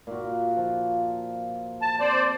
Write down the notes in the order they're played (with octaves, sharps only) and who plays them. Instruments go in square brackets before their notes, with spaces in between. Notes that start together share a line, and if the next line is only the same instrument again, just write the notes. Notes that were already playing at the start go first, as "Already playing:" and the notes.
[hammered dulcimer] A#2 F#4
F3
[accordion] A5
[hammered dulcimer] C4 [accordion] C5 D5